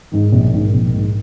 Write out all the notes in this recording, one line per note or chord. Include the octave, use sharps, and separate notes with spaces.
G#2 D#3
A#1
G#2 D#3
A#1
G#2 D#3